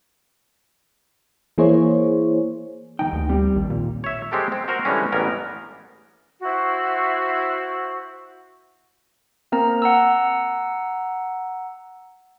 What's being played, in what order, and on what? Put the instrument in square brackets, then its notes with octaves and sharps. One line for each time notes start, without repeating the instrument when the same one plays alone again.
[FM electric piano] E3 A#3 E4 G#4 C5 C#5
[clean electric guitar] D#2 E3 G5 [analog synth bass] D#4
[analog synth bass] D2
[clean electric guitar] G3 C4
[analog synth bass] A#1 [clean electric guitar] D#2
[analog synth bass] A#2
[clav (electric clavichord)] C#5 E5
G#3 C4 G4 A4 A#4
C4
F#4 A#4 C5 A#5
D3 E3 G3 G#3 C#4
A1 G3 B3 G#4 A#4
[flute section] E4 F#4 C5
[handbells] A#3 C4 A#4 A#5
F#5 A#5 E6